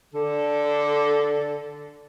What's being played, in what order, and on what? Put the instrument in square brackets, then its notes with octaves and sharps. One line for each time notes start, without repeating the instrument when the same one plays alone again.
[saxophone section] D3 A4